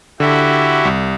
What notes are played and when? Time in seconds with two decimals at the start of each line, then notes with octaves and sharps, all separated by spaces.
0.20 D3 E4 F#4 G4
0.85 C2